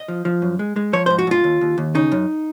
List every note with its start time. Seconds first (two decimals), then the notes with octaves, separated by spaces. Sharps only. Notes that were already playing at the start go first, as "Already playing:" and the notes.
Already playing: D#5
0.08 F3
0.25 F3
0.42 F#2
0.59 G#3
0.76 G#3
0.93 F3 C#5
1.06 C5
1.10 G#2
1.19 F#4
1.27 G#2 F4
1.44 D#2
1.61 D#2
1.78 D#2
1.95 C#3 D#4
2.12 F#2